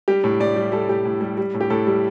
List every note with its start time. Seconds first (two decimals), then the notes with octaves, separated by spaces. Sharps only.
0.08 G3 G4
0.24 A2
0.40 A2 D5
0.56 G3
0.72 G3 A4
0.88 A2 G4
1.05 A2
1.21 G3
1.38 G3
1.54 A2
1.61 G4
1.70 A2 A4
1.87 G3